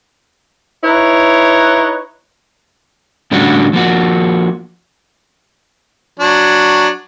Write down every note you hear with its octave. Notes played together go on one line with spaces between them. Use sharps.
D#4 E4 B4 C#5
A2 D3 G3 C#4 D4 F#4
F3 A#3 F#4
F#3 D4